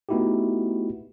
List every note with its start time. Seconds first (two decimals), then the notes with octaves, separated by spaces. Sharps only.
0.09 A3 B3 D#4 E4 F#4 G4